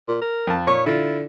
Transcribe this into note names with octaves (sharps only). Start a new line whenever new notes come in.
A#2
A#4
F2 A5
A#2 C#5 C#6
D3 E4 F4